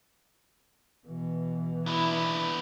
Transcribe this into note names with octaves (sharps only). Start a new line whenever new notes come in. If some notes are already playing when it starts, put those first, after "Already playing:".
B2 E3
B3 D4 E4